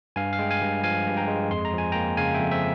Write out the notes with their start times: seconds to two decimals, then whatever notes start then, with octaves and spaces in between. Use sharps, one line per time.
0.16 G2 F5 G#5
0.33 F5
0.39 G#3 G5
0.51 F5 G#5
0.62 G2
0.83 F3 F5 G#5
1.06 G2
1.17 G5 A#5
1.28 G#3
1.50 F2 C6
1.65 A#5
1.73 F3
1.78 G#5
1.92 G5 A#5
1.95 A#3
2.17 C#3 F5 G#5
2.34 E5 G5
2.39 F2
2.51 C5 E5